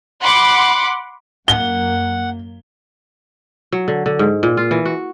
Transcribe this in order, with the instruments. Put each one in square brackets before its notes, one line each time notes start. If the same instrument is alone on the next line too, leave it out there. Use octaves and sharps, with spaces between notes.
[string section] F#5 B5 C6 D6
[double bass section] F#2 A#3 [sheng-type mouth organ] F#5 [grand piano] G7
[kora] F#3
D3
D3
G#2
A#2
F4
E3
F#4